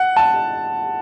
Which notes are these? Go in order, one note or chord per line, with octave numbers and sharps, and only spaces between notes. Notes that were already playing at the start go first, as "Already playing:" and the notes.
Already playing: F#5
A5